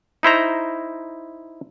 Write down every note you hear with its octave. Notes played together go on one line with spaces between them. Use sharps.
D#4 E4 C5 A#5